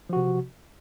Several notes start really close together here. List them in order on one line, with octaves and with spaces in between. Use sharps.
F3 F#4 C3